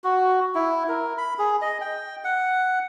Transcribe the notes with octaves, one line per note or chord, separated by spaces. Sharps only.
F#4
E4
A#4
B5
G#4
D#5
G5
F#5